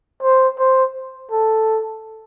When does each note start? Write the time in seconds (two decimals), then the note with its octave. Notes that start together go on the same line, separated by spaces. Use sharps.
0.23 C5
0.59 C5
1.31 A4